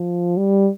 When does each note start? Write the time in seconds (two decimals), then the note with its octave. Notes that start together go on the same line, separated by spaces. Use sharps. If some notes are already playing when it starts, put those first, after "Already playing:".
Already playing: F3
0.37 G3